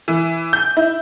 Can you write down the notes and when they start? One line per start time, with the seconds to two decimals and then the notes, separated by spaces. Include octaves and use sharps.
0.08 E3
0.53 G6
0.77 E4